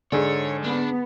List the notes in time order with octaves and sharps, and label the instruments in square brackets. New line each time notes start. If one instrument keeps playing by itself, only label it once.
[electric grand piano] G#2 A4 D5 [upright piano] D3 G#4 [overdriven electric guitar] C#5
[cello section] B3 [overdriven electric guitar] D4